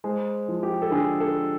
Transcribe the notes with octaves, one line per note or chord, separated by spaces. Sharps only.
G#3 C5
F3
G4
A4
D3 G#4
A4